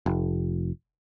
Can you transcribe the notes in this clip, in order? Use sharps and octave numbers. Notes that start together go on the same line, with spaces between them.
F1